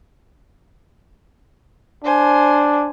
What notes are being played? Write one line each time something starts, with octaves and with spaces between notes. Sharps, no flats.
D4 C5 G#5